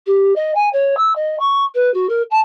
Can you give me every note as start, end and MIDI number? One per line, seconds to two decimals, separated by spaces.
0.07 0.35 67
0.36 0.54 75
0.55 0.69 80
0.73 0.95 73
0.97 1.15 88
1.16 1.38 75
1.40 1.65 85
1.75 1.92 71
1.94 2.07 66
2.09 2.22 70
2.31 2.40 81